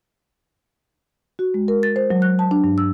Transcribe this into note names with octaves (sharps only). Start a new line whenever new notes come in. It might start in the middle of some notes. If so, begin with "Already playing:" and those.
F#4
G#3
A#4
A6
C5
F#3
F#6
A5
D4
G2
E6